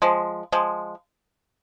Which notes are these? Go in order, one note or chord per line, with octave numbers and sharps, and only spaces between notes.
F3 G#3
F3 G#3